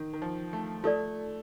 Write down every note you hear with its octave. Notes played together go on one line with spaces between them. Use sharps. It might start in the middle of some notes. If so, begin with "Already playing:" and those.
Already playing: D#3
D#3
F3
A3
A3 F4 A4 D5